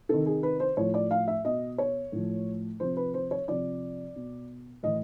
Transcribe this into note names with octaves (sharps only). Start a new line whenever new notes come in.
C3 D#3 A4
G#4
B4
C5
A2 F3 C#5
D5
F5
E5
B2 D#5
C#5
A2 F3
C3 F3 C5
B4
C5
C#5
C3 F3 D5
B2
A2 E3 D#5